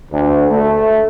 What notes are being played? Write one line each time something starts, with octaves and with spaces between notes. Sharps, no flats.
D2
A3